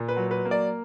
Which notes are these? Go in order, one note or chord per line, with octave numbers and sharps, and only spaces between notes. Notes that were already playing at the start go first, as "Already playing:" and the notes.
Already playing: A#2
B4
F#3
B4
A#3
D5